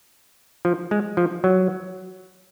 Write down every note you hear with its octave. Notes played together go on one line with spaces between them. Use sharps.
F3
G#3
F3
F#3